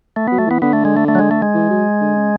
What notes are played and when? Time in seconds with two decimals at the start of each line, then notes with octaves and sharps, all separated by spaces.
0.16 A3
0.28 F#3 B3
0.38 A3
0.47 E3 B3
0.62 D3 B3
0.73 A3
0.85 G#3
0.97 A3
1.08 A3
1.15 F#3
1.19 G#3
1.31 A3
1.42 G#3
1.54 E3
1.70 F#3
2.01 D3
2.16 C#3